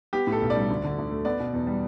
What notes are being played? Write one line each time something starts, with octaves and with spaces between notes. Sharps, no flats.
B3 G4
A2
A4
B1
D5
G3
D2
D3
D2
A3
B3 D5
B2
E2
G3